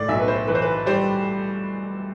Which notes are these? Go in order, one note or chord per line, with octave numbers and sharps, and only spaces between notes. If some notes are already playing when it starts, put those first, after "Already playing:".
Already playing: A2 D5
B1 E5
B4
C5
E3 B4
C5
B4
G3 C5